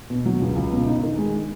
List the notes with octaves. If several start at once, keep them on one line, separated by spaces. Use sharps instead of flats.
B2
F#3
C#2
C#2
B2
D#4
D#3
G#3